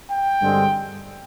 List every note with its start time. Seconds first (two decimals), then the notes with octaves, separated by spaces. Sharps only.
0.10 G5
0.42 G2 D3 G#3 C4